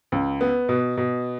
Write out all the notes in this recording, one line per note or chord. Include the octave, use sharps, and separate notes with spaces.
C#2
B3
B2
B2